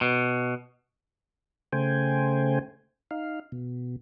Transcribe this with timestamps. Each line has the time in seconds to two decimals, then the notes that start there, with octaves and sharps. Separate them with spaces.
0.01 B2
1.73 C#3 A3 C5 G5 G#5
3.11 D#4 F5
3.52 B2